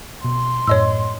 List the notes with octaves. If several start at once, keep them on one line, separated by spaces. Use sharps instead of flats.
B2 C6
F#2 A2 C#5 D#5 E6